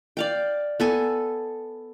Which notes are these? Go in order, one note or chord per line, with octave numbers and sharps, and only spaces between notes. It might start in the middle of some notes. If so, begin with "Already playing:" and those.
D5 F5 G5
B3 A4 G#5